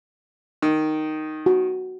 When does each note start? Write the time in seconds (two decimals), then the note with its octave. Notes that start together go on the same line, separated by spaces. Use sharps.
0.62 D#3
1.46 F#4